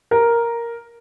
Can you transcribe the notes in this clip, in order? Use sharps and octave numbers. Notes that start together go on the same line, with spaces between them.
A#4